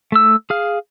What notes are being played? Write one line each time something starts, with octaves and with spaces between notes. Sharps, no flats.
A3 E6
G#4 F5